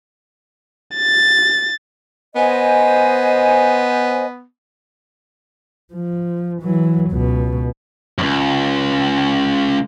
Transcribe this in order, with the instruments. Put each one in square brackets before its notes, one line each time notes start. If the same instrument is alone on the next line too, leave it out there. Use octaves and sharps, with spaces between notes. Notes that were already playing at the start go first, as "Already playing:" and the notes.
[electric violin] A6
[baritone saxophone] B3 [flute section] C5 D#5 G#5
[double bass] F3
E3 F#3
C#2 B2
[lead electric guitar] C#2 F#2